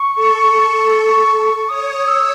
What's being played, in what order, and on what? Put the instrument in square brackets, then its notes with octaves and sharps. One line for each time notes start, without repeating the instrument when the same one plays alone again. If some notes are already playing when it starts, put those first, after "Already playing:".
Already playing: [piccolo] C#6
[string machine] A4
[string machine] C#5 [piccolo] D#6
[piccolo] E6